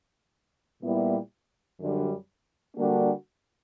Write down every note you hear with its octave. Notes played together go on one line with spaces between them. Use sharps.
A#2 G3 B3 E4
F#2 D3 G3
D3 G3 A#3 D4 F#4